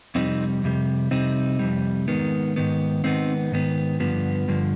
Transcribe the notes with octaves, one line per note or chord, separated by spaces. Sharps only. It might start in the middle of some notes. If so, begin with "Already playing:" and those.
F2 C3 G3 C4 D#4
F2 C3 G3
F2 C3 G3 C4 D#4
F2 C3 G3
G#2 D#3 B3
G#2 D#3 B3
G#2 D#3 B3 C4 D#4
G#2 D#3 B3
G2 D3 F3 B3
G2 D3 F3